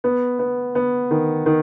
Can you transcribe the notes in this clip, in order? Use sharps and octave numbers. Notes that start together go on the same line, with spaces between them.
B3
B3
B3
D#3
D#3